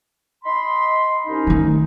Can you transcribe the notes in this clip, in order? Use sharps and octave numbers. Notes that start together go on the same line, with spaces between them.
D#5 B5 C6
C2 C#4 D#4
D#3 A3